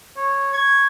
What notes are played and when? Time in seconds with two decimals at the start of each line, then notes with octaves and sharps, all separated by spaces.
0.17 C#5
0.53 C#6 G#6